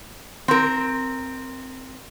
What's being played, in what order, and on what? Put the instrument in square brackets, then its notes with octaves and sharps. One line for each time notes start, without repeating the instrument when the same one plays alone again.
[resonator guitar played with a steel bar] C4 A#4